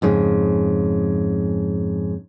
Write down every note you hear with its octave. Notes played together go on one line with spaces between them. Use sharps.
F2 G#2 C#3